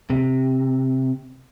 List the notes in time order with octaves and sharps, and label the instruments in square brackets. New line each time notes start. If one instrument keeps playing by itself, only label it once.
[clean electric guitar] C3